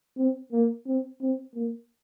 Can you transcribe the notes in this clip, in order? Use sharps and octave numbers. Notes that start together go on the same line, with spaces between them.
C4
A#3
C4
C4
A#3